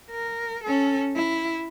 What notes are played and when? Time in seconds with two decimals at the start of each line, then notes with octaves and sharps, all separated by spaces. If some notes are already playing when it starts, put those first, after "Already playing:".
0.11 A#4
0.64 C#4 A4
1.16 E4